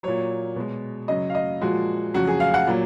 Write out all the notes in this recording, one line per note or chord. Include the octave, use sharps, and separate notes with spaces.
A#2 F#3 C#5
B2 G#3
F#2 C#3 F#3 D#5
F5
D#5
A#2 F3 G#3 F#4
F2 C#3 F#3 F#4
G#4
F5
F#5
A#2 F#3